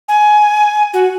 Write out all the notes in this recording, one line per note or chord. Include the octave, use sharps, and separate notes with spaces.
G#5
F#4